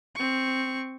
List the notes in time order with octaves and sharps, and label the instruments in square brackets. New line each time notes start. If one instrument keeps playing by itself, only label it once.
[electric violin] C4 C#6